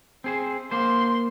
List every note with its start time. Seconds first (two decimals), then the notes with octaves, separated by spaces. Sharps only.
0.24 C4 G#4 C5
0.71 A#3 C5 C6